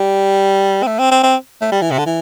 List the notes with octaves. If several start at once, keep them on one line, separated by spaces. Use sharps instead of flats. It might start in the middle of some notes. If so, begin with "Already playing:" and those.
Already playing: G3
C4
A3
C4
C4
C4
A3
G3
E3
C3
D3
E3